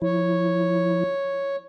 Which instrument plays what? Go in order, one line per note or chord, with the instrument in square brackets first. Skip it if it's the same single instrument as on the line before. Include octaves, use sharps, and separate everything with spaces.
[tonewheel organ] F3 E4 [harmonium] C#5